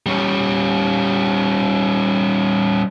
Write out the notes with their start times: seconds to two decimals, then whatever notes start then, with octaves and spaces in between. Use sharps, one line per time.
0.06 G3 C#4